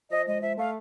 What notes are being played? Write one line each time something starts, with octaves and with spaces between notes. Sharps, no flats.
F3 D#5
G#3 D#5
F3 E5
A3 F5